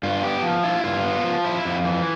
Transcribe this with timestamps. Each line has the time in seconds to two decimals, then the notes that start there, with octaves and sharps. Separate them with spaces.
0.03 G2 F4
0.23 B3 G4
0.43 F3
0.63 E4 F4
0.84 G2 F4
1.04 B3
1.24 F3
1.45 E4
1.65 F2
1.85 E3